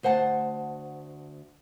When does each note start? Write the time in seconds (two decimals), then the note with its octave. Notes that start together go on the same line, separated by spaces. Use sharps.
0.03 D2 C5 F#5 G#5 A5